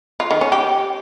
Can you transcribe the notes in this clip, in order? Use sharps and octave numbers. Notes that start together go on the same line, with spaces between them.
F4
D#3
C#4
G4